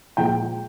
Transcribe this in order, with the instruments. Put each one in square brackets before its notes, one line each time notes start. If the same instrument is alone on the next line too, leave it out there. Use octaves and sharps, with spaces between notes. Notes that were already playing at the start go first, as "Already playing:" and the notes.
[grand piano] A#2 F3 G#3 G5